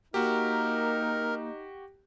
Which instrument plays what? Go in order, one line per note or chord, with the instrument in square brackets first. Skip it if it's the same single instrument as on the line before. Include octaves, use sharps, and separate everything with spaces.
[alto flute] A#3 [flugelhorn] D#4 [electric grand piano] F#4 G4 [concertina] A#4